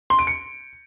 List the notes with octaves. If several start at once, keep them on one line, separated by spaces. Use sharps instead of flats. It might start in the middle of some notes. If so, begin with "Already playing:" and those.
C6
D7
C#7